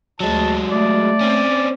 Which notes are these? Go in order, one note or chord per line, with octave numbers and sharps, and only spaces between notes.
D2 F#3 G#3 A5
A3 D5
C4 C#4